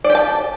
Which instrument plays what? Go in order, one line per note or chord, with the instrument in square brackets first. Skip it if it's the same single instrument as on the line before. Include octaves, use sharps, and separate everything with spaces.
[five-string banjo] D5
G4
A5